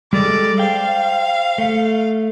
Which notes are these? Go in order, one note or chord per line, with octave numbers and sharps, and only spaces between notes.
G3 G#3 A4 D5
C5 F5 G5
A3